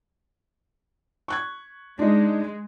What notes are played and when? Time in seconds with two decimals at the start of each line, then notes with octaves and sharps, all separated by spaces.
1.28 C#6 F#6 G#6
1.99 G#3 D4 D#4